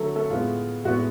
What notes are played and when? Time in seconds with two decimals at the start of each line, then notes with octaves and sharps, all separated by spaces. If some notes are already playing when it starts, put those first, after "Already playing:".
Already playing: D3 F#3 A3 A4
0.15 A3 A4
0.30 A2 G#3 B3 F4
0.84 A2 G#3 B3 F#4